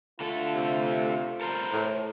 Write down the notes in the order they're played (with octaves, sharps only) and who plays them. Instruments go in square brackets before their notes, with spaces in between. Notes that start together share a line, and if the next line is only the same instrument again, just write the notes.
[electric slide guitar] D3 A3 A4 [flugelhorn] F4
[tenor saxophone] C3
[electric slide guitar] A4 A#4 C5
[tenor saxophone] A2